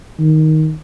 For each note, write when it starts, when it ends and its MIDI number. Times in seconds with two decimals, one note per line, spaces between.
0.20 0.73 51